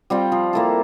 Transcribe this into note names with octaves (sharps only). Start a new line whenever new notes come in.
G3 C4 F4
F3
A#3 E4 A4